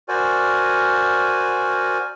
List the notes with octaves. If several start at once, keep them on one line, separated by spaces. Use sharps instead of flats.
F#4 A#4 C5 D5 G#5